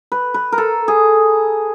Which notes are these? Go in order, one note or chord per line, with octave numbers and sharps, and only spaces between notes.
B4
B4
A#4
A4
G#4